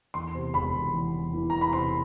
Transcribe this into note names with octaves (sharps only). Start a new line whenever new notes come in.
E2 C6
C3
E1 B5
E1
E2
E2
E3
E2 A#5
B5
C3 C6